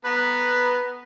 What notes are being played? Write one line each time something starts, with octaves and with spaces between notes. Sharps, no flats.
B3 B4 A#5